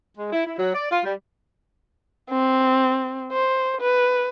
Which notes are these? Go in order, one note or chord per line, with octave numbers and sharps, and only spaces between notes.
G#3
E4
E4
F#3
D5
F4
G3
C4
C5
B4